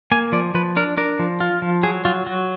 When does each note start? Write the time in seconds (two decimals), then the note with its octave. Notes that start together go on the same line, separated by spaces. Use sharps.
0.12 A#3 G#5
0.32 F3 D5
0.54 F3 B4
0.76 D4 A#4
0.97 D4 A#4
1.19 F3
1.40 F4
1.62 F3
1.83 F#3 G#4
2.05 F#3 F4
2.26 F#3 F#4